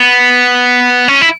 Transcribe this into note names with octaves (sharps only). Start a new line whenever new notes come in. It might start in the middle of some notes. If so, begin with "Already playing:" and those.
Already playing: B3
C#4
E4